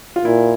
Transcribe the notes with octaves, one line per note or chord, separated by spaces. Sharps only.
F4
A#2 E4